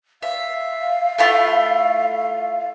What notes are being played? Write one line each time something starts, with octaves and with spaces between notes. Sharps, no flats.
E5 F5
A3 E4 F4